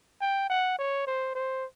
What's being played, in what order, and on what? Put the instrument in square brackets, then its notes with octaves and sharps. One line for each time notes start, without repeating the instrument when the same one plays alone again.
[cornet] G5
F#5
C#5
C5
C5